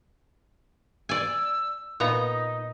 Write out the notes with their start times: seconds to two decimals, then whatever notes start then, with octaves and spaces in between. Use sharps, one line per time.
1.09 D5 G#5 E6
2.00 A#2 B3 D#4 A#5